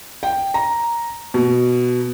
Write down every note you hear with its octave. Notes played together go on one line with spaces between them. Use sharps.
G5
A#5
B2